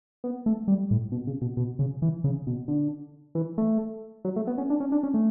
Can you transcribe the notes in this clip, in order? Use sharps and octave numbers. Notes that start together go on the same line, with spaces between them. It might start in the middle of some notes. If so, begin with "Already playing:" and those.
B3
A3
G3
A2
B2
C#3
B2
B2
C#3
E3
C#3
B2
D3
E3
A3
F#3
A3
B3
C#4
D4
C#4
D4
C#4
A3